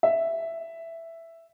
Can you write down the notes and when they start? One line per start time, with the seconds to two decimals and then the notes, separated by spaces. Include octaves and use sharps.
0.03 E5